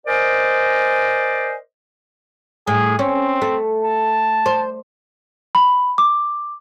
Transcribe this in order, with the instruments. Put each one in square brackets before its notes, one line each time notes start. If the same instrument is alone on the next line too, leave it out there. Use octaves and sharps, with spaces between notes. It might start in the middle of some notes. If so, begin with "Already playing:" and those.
[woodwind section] A#4 C5 D5 D#5 G#5
[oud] A2 [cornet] G#4
[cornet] C4 [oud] C#4
[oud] A3
[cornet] A5
[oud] C5
[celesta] B5
D6